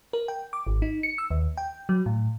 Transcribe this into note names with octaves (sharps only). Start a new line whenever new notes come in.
A#4
G5
D6
G#1
D#4
C#7
E6
D#2
G5
F#3
A2